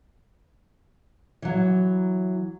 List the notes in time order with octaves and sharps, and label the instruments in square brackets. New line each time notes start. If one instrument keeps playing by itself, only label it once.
[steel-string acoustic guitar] E3 F#3